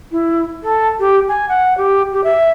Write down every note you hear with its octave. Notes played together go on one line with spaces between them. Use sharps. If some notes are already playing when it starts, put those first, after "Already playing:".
E4
A4
G4
G#5
F#5
G4
G4
E5